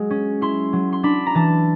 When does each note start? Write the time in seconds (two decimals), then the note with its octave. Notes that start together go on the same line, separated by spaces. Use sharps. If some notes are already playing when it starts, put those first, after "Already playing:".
Already playing: F#3 G#3
0.10 C#4
0.41 E4 C6
0.73 F#3
0.93 C6
1.03 D4 B5
1.26 A#5
1.35 E3 A5